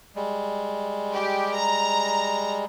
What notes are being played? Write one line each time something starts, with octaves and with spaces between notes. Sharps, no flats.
G3 G#3
G4
A#5